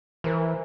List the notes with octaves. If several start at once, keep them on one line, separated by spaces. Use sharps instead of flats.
E3 A#4 C5